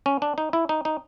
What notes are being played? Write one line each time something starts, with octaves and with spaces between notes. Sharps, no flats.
C#4
D4
D#4
E4
D#4
D#4